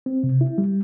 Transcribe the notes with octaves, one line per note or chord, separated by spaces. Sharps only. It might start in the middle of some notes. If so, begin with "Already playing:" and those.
C4
C3
E4
G3